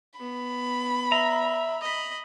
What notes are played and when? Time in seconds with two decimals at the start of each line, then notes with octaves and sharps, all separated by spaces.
0.19 B3 B5
1.12 E5 A#5
1.81 D#5 B5